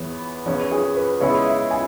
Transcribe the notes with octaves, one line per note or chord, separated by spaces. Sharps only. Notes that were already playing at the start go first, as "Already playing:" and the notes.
Already playing: E2 E3 B3 C#5
E2 E3 C#4 C#5
G#4
B4
C#3 G#3 B3 E4 G#4 C#5
E5
G#5